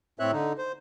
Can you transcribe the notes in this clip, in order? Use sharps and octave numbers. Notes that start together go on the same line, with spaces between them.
A2 C4 C#5 E5 F#6
D3 D#4
C5